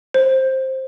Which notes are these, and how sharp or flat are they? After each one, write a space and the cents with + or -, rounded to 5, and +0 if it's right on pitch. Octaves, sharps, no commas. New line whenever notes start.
C5 +10